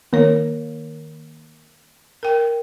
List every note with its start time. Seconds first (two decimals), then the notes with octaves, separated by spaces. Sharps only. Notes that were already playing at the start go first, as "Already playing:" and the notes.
0.13 D#3 A#3 A#4 C#5
2.23 A#4 G5